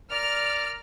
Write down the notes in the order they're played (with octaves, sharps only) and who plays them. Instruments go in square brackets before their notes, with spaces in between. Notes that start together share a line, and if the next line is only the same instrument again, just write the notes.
[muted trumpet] A#4 [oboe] D5 [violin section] F6